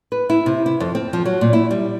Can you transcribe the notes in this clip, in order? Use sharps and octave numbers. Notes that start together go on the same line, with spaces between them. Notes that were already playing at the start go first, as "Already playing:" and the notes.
B4
E4
C3
E4
F2
C4
F3
F#3
A#2
E4
G3